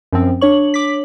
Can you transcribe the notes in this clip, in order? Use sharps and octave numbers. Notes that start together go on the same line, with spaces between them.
F#2 F3 C4
D4 C#5 C#6 F#7
D6 B6